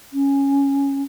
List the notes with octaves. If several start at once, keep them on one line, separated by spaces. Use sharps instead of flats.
C#4